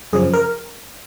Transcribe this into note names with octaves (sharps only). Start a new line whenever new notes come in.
F#2 C#3 F3 G#4
A#4